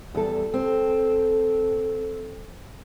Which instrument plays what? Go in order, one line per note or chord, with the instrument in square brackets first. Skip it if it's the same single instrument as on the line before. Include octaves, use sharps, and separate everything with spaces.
[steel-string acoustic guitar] E2 A4 [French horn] G3
[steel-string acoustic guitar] C4 [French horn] A4